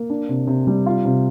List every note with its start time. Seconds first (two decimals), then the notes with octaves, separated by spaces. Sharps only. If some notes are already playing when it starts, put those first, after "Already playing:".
Already playing: A#3
0.10 D4
0.29 C3
0.47 C3
0.67 G3
0.86 F4
1.05 C3